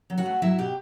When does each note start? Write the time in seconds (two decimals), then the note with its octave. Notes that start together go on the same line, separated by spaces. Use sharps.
0.10 F#3
0.18 F#4 F#5
0.26 A3
0.42 F#3 E4 E5
0.58 B2 G4 G5